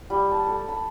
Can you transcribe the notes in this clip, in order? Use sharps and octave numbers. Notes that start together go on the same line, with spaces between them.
G3
A5
A4
B5